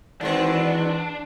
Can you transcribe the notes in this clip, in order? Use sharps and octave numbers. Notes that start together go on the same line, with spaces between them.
D#3 E3 G#3 C4 D4 F#4 B4